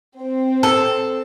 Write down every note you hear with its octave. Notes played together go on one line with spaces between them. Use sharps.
C4
A4